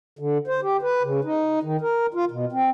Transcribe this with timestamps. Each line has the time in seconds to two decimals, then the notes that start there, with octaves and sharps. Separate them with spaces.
0.19 D3
0.47 C5
0.63 G4
0.82 B4
1.03 C#3
1.24 D#4
1.63 D#3
1.81 A#4
2.14 F4
2.31 B2
2.52 C4